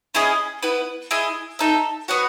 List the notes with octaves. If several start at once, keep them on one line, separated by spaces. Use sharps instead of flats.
C#4 E4 G#4 D#5
B3 E4 B4
E4 G#4 D#5
D#4 A4 E5
B3 F#4 C#5 F#5